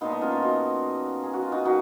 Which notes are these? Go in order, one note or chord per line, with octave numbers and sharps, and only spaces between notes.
A#2 F3 A#3 B3 D#4
B3 D#4
C#4 F4
C#4 F4
D#4 F#4
G#4
F#4
F4
D#4 F#4
D#3 F#3 A#3 D#4 F#4